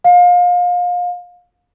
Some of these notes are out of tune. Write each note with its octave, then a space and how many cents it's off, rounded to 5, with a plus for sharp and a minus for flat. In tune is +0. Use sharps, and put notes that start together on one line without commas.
F5 +30